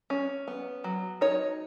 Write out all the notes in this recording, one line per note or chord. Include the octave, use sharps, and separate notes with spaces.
C#4
B3
F#3
D#4 C#5